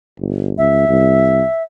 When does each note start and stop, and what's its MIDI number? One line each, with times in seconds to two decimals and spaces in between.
0.19 0.53 31
0.58 0.85 37
0.58 1.63 76
0.88 1.42 36